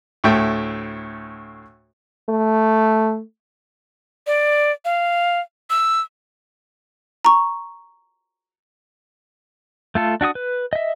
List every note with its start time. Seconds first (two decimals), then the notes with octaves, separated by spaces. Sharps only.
0.24 D2 A2 A3 E5 G5
2.29 A3
4.27 D5
4.85 F5
5.70 E6
7.25 A#5 C#6
9.95 A3 F4 A4
10.21 D4 F#4 E5 D#6
10.35 B4
10.73 D#5 E5